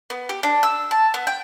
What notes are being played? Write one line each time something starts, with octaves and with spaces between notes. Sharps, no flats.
B3
G4
D4
E6
A5
B3
G5